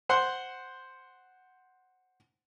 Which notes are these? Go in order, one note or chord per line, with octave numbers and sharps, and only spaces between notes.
C5 F#5 C6 F#6